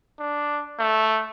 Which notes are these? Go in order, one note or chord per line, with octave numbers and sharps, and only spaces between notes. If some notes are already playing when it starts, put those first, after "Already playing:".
D4
A3